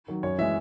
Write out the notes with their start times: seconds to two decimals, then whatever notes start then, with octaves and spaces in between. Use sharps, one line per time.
0.08 D#3 F#3
0.23 F#2 C#5
0.38 E3 G#3 E5